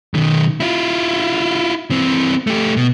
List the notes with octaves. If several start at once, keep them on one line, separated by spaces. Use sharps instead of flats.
B1 D#3
E4 F4
E3 C4
A3 G4
B2